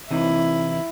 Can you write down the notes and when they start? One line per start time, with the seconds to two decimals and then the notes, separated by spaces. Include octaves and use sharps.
0.11 C3 E3 D#4 E4